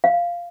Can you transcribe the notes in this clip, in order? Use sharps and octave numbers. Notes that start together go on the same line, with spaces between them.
F5